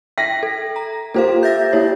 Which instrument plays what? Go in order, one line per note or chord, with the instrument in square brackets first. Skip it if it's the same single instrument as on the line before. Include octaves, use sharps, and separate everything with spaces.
[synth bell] E5 G5 [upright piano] A#6 B6
[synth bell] A4
A#5
[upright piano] A#3 G4 [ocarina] F4 [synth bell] A4 C5 F5
[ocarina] E5 [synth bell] G6 A6 A#6
[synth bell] A#3 E4 C#5 [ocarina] G4